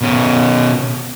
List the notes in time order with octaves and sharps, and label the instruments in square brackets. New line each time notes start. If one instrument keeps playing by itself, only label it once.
[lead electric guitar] B2 C#4